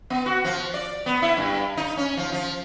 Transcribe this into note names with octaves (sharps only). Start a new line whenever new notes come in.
B3
F#4
F3
D5
B3
E4
G2
D#4
C#4
F3
F3